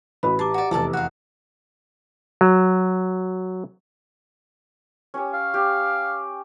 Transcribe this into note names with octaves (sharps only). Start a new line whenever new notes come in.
A1 F#4 B4 B5
G4 A5 A#5 D6
F#4 D5
F1 E2 A4 D5 A5
F#4 F5 F#6
F#3
C#4 G4 C#5
F5
G4